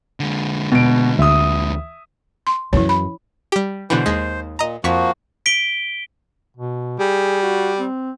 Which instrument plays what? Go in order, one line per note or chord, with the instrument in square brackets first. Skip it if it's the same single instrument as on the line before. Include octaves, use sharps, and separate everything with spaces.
[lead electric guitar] D3 G#3
[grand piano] B2 D7
[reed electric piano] D2 [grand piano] E5 D#6
[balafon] C6
[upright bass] F#2 E3 [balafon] E4 C#5
[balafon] B5
[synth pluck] G3 G4
[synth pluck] B2 D3 E3 [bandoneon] C5
[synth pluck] D#2 G#3
[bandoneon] A#2 [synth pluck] D#5 A#5
[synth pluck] F2 C#6 B6 [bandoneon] F3 A#3 F#4
[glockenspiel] B6 D7 G7
[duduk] B2
[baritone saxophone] G3 [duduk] G#4
[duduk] F#4
C4